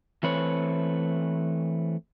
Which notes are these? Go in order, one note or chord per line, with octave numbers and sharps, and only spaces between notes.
E3 A3 C4 B4 C#5